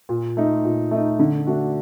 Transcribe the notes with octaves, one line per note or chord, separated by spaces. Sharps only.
A#2
A3 D#4
A#2
A3 D#4
D3
A3 D4 F#4